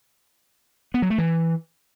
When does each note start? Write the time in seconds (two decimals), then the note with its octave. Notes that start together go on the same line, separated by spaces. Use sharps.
0.94 B3
1.02 F#3
1.10 A3
1.18 E3